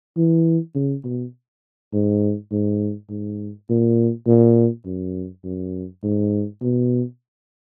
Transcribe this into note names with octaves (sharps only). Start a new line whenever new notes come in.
E3
C#3
B2
G#2
G#2
G#2
A#2
A#2
F#2
F#2
G#2
B2